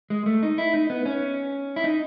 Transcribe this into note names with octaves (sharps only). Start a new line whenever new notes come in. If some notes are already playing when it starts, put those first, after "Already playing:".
G#3
A3
D#4
E4
D#4
B3
C#4
E4
D#4